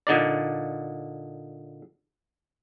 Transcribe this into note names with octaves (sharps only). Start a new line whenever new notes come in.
A#2 D3 D#4 D5